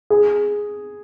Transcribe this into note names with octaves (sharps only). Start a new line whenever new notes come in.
G#4